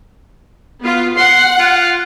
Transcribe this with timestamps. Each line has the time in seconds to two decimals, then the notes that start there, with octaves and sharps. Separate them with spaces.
0.82 B3 F4
1.17 F#5 C6
1.59 F4